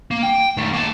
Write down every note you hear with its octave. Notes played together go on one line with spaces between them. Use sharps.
A#3
G5
D#3 A3
A#3 A5